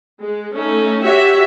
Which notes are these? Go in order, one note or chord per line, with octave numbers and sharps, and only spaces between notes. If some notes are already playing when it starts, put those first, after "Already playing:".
G#3
A3 C#4 D#4
F#4 G4 C#5 E5